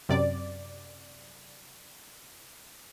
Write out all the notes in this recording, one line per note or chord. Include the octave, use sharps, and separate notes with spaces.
F#2 C3 D5